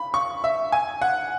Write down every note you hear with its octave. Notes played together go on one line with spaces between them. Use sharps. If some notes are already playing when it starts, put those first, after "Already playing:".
Already playing: B5
C#6
E5
G#5
F#5